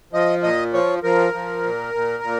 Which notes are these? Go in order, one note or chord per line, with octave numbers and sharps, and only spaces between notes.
F3 D#5
A#2 D#5
F3 C#5
F3 A#4
F3
A#2
A#2
A#2